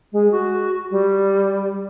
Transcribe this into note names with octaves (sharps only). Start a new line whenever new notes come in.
G#3
F#4
G3